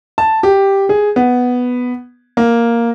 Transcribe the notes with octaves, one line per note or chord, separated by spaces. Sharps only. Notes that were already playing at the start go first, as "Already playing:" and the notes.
A5
G4
G#4
B3
A#3